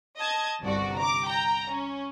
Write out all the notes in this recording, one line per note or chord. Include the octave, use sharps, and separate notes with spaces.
D#5 A5 G#6
G1 C2 G2 F#4 D5
A#5 D6
G5 A#5
C#4